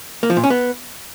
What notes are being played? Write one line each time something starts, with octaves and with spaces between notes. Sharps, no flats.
A#3
F3
A#2
C#4
B3